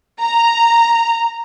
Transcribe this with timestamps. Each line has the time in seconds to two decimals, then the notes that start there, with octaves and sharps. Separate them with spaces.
0.21 A#5